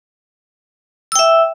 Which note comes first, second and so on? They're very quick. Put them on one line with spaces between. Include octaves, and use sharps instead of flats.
E6 G5 E5